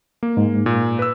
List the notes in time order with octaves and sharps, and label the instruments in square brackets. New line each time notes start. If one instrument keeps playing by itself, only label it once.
[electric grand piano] A#3
[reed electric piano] G#2
[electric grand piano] A#2
B4 E6